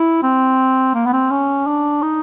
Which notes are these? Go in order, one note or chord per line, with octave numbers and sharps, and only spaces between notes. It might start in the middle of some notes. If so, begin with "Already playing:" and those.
Already playing: E4
C4
A#3
B3
C4
C#4
D4
D#4